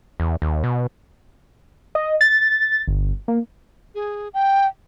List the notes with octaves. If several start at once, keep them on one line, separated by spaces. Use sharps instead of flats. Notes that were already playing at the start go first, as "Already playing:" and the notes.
E2
D#2
B2
D#5
A6
G1
A#3
G#4
G5